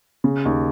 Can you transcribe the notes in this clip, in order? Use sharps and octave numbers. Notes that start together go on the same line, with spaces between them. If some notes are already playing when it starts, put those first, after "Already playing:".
C#3
D#2